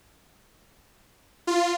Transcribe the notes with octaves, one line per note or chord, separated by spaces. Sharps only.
F4